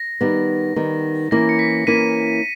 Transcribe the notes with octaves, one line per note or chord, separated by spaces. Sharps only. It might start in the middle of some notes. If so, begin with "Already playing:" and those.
Already playing: A#6
D#3 G3 B3
D#3 G3 B3
E3 A#3 C#4 E4 A#4 A#6
C#7
B6
E3 A#3 C#4 E4 A#4 B6 D#7